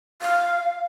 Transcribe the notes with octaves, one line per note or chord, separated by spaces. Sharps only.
F5